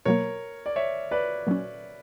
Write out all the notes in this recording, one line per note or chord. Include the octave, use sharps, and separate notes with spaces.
B2 F#3 A#3 A#4 C#5
D5
C#5 E5
B4 D5
A#2 F#3 C#4